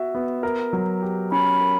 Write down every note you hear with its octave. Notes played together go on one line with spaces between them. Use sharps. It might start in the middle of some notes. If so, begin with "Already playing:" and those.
Already playing: B3 F#4 E5
B3
A#4
F#3
G4
C#4 B5
A#4